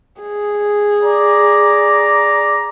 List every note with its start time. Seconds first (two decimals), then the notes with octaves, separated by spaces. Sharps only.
0.21 G#4
1.04 D5 A#5